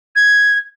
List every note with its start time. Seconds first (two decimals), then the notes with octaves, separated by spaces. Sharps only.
0.16 G#6